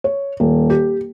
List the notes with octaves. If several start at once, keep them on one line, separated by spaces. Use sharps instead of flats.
C#5
D#1
G4